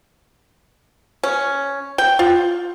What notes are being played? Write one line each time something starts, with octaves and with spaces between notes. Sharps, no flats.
C#4
G5
F4